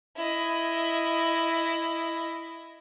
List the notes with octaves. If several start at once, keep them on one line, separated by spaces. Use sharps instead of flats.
E4 D#5